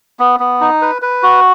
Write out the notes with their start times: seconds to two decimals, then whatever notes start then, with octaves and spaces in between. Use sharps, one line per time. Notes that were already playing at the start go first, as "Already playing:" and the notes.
0.19 B3
0.40 B3
0.61 D#4
0.82 B4
1.02 B4
1.23 F#4